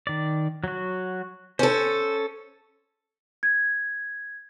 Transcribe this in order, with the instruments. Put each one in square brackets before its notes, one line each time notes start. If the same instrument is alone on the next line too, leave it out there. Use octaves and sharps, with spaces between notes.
[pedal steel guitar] D#3 D5
F#3 F#4
[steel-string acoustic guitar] C#4 A4 [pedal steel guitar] C5
[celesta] G#6